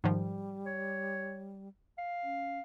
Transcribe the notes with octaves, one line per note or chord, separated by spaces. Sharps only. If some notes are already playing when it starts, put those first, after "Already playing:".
G#2 D#3 F3 G3
C#5
F5
C#4